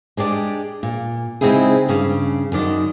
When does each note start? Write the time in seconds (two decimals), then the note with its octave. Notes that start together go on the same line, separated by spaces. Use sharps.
0.17 G#3 D4 G4 D5
0.83 A#2
1.41 C#3 G#3 C4 D#4 E4 G#4
1.88 G2 C#3 C#4
2.52 F#2 D#3 D5 D#5